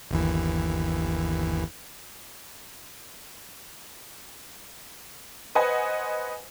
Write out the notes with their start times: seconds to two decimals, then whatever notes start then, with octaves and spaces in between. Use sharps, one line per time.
0.11 G1 D#2 E3
5.55 B4 C5 D#5 F#5 G#5